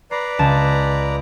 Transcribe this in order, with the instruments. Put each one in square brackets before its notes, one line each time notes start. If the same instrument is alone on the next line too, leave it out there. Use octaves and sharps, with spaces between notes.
[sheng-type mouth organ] B4 D5 A#5 [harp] C7
[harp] C#2 A5 E7